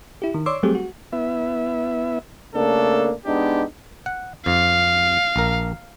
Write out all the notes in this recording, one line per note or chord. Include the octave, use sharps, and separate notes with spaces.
E4 G4
D#3
C#5 D5 C6 D6 E6
F#3 G3 A3 C4 G4 G#4
F#4
B3 E4 E5
C#3 A3 A#3 D4 A4
G#3 B3 D4 D#4 G4
F#5
F2 F5
A#1 A#4